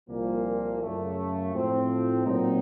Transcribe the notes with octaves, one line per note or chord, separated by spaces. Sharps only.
C2 A#2 F3 A#3
F#2 C#3 A3
A2 F3 C4
A#2 F#3 C4 D#4